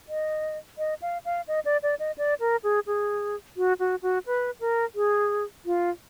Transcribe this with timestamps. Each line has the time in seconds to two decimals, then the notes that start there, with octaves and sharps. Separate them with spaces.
0.09 D#5
0.78 D#5
1.02 F5
1.25 F5
1.48 D#5
1.65 D5
1.83 D5
1.99 D#5
2.18 D5
2.40 A#4
2.64 G#4
2.87 G#4
3.57 F#4
3.79 F#4
4.02 F#4
4.26 B4
4.60 A#4
4.95 G#4
5.66 F4